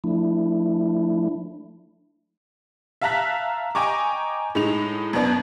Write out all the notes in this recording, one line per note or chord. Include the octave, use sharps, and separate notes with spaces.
F3 A3 D4 E4
E5 F5 A5 A#5 F#6 B6
D#5 G5 G#5 A#5 C#6 D6
A2 G#3 D#4 F7
F#2 B2 B3 D4